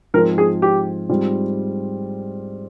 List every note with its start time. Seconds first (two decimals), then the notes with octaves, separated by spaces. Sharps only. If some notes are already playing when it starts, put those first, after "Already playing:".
0.14 G#2 F3 C4 F4 A#4
0.38 G#4
0.62 G4
1.09 G#2 G3 C4 F4